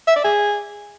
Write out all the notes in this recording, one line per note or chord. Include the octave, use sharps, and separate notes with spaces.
E5
D5
G#4